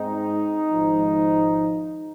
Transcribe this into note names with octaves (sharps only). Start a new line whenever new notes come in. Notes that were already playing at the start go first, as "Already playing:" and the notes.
Already playing: G#2 G#3 C4 D#4
G#1 G#2 F3